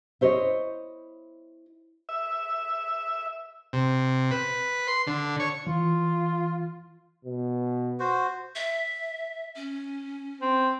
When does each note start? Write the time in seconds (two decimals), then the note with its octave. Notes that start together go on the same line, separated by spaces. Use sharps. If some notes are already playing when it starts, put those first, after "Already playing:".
0.21 E4 C5 C#5 D#5
2.09 E5
3.73 C3
4.31 B4
4.88 C6
5.07 D3
5.40 C#5
5.67 E3 F4
7.25 B2
8.00 F#4 C5
8.56 E5
9.56 C#4
10.41 C4